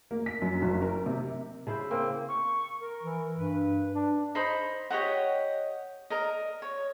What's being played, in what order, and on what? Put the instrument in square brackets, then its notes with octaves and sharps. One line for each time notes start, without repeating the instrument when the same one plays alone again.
[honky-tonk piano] A#3
B6
F#2
F#1
A#4
C3
[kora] C#3 E4 C5
[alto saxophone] A#3 [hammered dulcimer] C4
[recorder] C#6
A#4
[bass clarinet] E3
[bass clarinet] G2 [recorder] B4
[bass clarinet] D4
[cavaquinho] D#4 C5 B5 D#6
G4 C#5 D#5 F#5
A#4 D#5
C#5